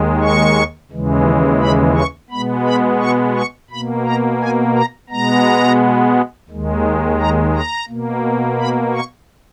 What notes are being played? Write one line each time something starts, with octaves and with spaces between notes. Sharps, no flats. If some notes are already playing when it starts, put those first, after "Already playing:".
Already playing: D#2 D#3 G#3
C#6
D#2 C#3 E3 G#3
B5
C#6
B2 G#3 B3 B5
B5
C#6
C#6
B2 A#3 B5
A#5
G#5
A#5
B2 G#3 B3 A#5
D#2 D#3 G#3
A#5
A#5
B2 A#3
B5
C#6